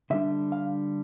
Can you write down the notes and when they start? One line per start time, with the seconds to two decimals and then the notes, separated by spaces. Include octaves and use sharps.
0.10 D3 G3 D4 E5
0.52 F5